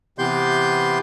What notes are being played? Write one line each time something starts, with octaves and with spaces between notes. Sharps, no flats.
C3 E3 B3 G4 C6 G6